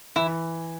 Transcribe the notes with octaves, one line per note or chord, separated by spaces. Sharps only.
E3 E4